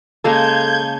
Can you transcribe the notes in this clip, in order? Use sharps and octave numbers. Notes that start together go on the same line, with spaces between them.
C#3 G#3 A#3 A4 A5 G6 G#6